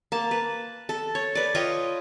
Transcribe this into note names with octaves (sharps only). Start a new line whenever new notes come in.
A#3 A5
B4
A4
C#5
B4 D5
F4 C#5 D#5 G5